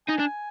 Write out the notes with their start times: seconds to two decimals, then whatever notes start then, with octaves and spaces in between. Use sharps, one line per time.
0.08 D#4 G#5
0.19 D4